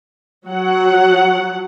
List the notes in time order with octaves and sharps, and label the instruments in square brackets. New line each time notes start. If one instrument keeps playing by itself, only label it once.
[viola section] F#3 F#5